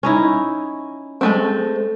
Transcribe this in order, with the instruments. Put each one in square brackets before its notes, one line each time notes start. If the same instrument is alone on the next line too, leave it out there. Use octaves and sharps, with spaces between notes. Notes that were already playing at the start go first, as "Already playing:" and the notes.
[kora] C#4 D#4 E4
[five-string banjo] G#3 A3 C4